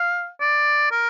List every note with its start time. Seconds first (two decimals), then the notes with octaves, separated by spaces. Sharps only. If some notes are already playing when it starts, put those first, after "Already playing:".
Already playing: F5
0.40 D5
0.92 A#4